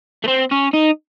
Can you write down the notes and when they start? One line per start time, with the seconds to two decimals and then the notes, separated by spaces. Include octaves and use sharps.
0.24 A3
0.28 C4
0.52 C#4
0.74 D#4